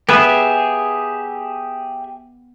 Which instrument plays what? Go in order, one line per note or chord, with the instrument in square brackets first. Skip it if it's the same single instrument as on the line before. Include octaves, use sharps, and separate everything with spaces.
[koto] B3 [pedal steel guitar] G4 G#4 E5